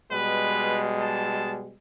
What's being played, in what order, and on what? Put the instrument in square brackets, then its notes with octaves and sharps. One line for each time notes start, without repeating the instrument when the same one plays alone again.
[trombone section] B2 G3 G#3 [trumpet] B4
[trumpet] A5